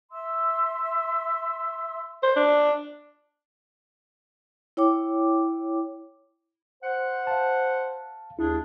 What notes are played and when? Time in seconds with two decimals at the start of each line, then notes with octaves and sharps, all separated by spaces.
0.10 E5 C6 E6
2.23 C5
2.36 D4
4.77 E4 C#5 G5 D6
6.83 C5 F#5
7.27 F5 A5
8.39 D#2 D4 E4 G#4